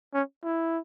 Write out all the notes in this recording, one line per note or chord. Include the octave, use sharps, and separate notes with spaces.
C#4
E4